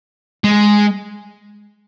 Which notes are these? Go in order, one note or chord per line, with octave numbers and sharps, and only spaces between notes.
G#3